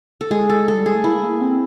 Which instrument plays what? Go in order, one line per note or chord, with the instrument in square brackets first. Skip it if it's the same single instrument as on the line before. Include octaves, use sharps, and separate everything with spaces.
[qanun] A4
[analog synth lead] G#3 [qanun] G#4
[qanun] A4
A4
[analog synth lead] G3
[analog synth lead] G#3 [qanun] G#4
[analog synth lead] A3
[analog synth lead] A#3 [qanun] E4
[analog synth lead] A#3
C4